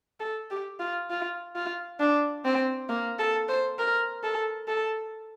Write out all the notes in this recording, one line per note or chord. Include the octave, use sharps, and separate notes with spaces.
A4
G4
F4
F4
F4
D4
C4
A#3
A4
C5
A#4
A4
A4